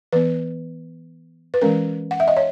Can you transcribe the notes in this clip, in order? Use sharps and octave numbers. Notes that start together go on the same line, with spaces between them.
E3 B3 B4
B4
E3 G#3 C#4 A#4
F#5
E5
D#5
C#5